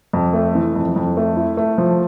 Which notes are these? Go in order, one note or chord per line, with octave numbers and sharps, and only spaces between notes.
F2
A3
E3
F2
F2
A3
E4
A3
F3